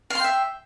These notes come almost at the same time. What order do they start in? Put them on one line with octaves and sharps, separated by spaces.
F5 C6 G5 E5